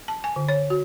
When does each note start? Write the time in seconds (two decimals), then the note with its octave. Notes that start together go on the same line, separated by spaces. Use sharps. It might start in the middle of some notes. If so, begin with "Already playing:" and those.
0.08 A5
0.24 G#5
0.36 D3
0.49 C#5
0.70 F#4